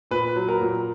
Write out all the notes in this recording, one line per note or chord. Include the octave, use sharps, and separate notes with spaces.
A#2 B4
F#3
A#4
A#2